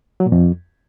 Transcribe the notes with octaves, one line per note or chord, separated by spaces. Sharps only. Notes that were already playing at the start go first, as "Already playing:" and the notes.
F#3
A#2
F2